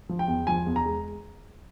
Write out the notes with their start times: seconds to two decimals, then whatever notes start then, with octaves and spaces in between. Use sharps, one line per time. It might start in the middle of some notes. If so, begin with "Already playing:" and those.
0.09 F3
0.19 G5
0.28 E2
0.47 F3 G#5
0.67 E2
0.76 A#5
0.86 G#3